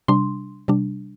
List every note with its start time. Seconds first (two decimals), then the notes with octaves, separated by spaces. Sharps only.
0.08 C3 G3 D4 C6
0.68 C3 G3 D4